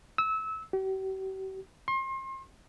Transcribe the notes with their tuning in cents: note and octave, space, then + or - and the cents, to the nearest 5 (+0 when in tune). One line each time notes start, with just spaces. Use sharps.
E6 -25
G4 -45
C6 +35